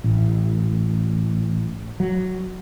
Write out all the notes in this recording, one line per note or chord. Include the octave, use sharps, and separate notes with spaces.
A1
F#3